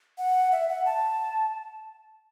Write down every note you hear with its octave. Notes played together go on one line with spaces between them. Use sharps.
F#5
E5
F#5
A5